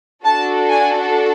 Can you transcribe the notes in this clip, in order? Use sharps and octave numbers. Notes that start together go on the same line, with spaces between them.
D4 F#4 A4 A5
G#5